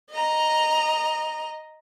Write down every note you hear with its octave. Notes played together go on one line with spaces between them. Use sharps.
D#5 A#5